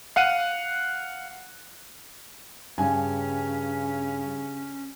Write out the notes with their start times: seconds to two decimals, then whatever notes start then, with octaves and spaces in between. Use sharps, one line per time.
0.16 F5 F#5 F#6 D#7
2.78 G2 C#3 C#4 G#5